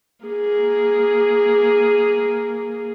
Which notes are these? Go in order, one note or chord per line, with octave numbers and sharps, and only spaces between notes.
A#3 G#4